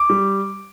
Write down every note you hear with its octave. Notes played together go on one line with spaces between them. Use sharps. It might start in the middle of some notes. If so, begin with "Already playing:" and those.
Already playing: D6
G3